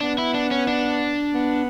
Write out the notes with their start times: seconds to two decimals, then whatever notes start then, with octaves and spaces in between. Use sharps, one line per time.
0.01 B3 D4
0.18 E4
0.34 D4
0.51 C#4
0.68 D4
1.34 B3